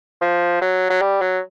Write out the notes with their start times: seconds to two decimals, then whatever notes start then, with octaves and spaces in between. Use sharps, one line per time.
0.21 F3
0.61 F#3
0.90 F#3
1.01 G3
1.21 F#3